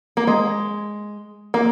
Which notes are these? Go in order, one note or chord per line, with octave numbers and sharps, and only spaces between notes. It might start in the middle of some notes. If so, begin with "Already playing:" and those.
A#3
G#3
A#3